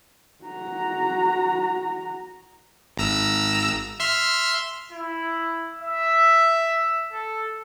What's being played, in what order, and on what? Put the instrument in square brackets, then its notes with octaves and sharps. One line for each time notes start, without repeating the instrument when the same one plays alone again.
[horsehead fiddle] F#4 A#5
[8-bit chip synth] G#1 A#5 E6
E5 C6 F6
[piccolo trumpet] E4
E5
A4